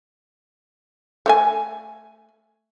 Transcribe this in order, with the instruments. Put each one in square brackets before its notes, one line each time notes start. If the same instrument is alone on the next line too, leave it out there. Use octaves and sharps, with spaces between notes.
[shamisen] A3 C#5 G#5